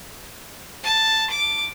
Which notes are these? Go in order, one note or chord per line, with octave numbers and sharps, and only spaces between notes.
A5
D6